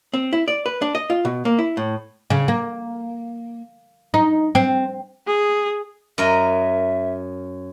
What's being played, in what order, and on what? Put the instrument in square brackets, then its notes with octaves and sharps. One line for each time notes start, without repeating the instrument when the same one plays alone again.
[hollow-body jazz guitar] C4
E4
D5
B4
D4
D#5
F4
B2
A#3
E4
A2
[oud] C#3
A#3
D#4
C4
[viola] G#4
[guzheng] F#2 A#4 D#5 [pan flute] E5